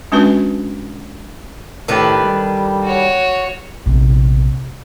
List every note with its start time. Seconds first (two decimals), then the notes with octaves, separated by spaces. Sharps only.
0.12 G#3 C#4 D4 F#4 B4
1.88 A2 D#3 D4 G4 A4 B4
2.23 G3
2.84 F#4 C#5
3.86 A#1 C3